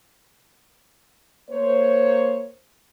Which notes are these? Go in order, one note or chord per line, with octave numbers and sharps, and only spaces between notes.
A#3 C5 C#5